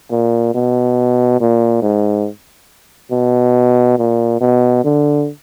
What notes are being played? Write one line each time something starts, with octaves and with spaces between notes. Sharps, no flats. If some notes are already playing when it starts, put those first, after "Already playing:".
A#2
B2
A#2
G#2
B2
A#2
B2
D3